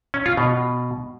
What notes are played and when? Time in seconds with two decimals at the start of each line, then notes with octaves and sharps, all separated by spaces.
0.14 C#4
0.26 F4
0.37 B2